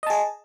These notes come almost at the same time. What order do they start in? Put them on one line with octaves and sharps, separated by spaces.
D#5 A5 G#4